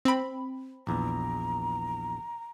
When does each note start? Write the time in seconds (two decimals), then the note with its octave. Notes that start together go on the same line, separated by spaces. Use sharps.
0.05 C4 B5
0.87 A#1 E2 A#5